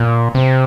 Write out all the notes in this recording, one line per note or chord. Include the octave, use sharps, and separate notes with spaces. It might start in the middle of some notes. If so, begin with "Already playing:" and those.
Already playing: A#2
C3